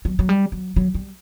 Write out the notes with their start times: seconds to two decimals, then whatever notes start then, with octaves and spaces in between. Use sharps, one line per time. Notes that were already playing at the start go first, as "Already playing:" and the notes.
0.05 F#3
0.19 F#3
0.29 G3
0.52 F#3
0.76 F#3
0.94 G3